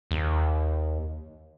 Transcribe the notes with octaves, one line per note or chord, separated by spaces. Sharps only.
D#2